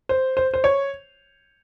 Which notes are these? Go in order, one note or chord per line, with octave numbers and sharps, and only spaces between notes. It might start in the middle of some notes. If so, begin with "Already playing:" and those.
C5
C5
C5
C#5